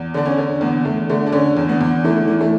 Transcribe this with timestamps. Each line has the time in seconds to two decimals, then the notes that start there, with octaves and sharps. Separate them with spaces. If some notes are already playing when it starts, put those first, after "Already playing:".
Already playing: E2
0.14 D3 D4
0.26 C#4
0.38 D3
0.61 E2 B3
0.85 E2 A3
1.10 D3 A3
1.27 D4
1.32 D3 C#4
1.57 E2
1.69 B3
1.81 E2
2.04 E3 A3
2.28 E3
2.41 A3